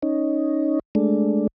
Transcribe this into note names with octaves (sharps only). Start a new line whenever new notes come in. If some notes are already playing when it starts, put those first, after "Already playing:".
C#4 D#4
G#3 A3 D4